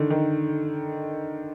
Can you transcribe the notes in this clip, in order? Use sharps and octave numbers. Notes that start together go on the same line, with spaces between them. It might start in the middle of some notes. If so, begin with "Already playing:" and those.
Already playing: D3 D#3
D#3